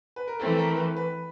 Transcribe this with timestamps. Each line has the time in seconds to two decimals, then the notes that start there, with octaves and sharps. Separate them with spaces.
0.16 B4
0.27 A#4
0.39 E3 A3 C4 A4
0.59 A#4
0.77 B4
0.96 B4